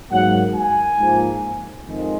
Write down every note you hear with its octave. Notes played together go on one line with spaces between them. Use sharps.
G#2 F#3 A#3 F#5
G#5
G#2 F3 A#3
F2 D#3 G#3